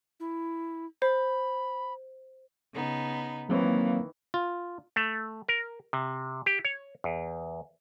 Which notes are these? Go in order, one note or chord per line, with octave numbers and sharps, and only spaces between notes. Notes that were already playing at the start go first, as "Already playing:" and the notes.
E4
C5 B5
C#3 B3 D#4
D#3 E3 F#3 A#3 C4 C#5
F4
A3
A#4
C3
G4
C#5
E2